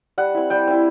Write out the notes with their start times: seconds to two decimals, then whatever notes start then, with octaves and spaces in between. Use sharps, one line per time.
0.18 G3 F#5
0.34 C4 E4
0.50 G3 G5
0.67 C4 E4